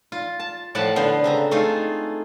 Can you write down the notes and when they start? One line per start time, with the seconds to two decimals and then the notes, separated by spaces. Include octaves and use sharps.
0.12 F4
0.40 A5
0.75 A2 F3 F5 F#5 A5 B5
0.96 D3 B3 C5 F5 C6
1.24 C#3 C4 A#5
1.51 A3 D#4 F4 G#4 A4